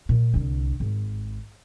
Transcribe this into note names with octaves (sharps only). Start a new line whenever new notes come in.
A#2
C2 D3
G#1